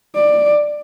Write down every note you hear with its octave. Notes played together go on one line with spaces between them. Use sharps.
D5